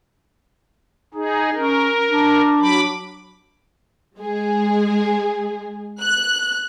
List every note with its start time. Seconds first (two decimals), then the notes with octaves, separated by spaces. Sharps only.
1.14 D#4 G#4
1.54 C#4 A#4
2.10 D4
2.60 F#3 B5 D6
4.18 G#3 G#4
6.01 F#6